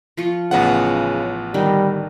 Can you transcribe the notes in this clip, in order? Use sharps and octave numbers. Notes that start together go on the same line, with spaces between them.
F3 F4 C#6
A1 C#3 B3 F#5
D3 D#3 G3 D#4